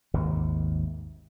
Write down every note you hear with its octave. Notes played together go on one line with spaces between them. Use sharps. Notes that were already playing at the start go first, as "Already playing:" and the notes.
G#1 D#2 C3